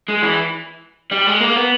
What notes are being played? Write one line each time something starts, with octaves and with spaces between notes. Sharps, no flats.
G#3
E3
G3
G#3
A#3
B3